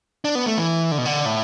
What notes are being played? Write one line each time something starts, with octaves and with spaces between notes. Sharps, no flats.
D4
B3
A3
E3
D3
B2
D3
A2